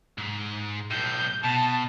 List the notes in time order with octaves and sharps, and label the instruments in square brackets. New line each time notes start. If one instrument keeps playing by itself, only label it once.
[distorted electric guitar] G#2
[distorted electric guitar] B1 A2 [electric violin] G6
[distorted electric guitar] B2 [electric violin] A5